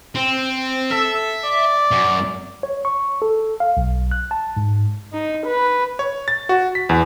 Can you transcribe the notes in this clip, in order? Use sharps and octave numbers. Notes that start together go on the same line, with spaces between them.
C4
A4 E5
D5
F#2
C#5
C#6
A4
F5
B1
F#6
A5
G#2
D#4
B4
C#5
A6
F#4
B6
E2